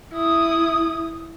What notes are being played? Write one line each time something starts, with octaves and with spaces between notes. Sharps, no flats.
E4 D#6